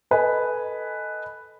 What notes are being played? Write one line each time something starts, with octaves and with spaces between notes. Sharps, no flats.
A4 B4 D#5 G#5